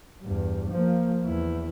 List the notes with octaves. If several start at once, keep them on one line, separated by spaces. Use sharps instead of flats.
E2 G2
F3 A#3
E2 E4